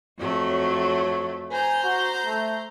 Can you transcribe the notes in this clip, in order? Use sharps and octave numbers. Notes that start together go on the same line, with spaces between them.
F2 F#3 A3
C#5
C5 G#5 A#5 G6
F#4
A3